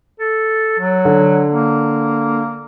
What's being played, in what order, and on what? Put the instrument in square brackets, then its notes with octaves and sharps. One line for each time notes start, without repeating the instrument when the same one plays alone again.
[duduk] A4
F#3
[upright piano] D3
[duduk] A#3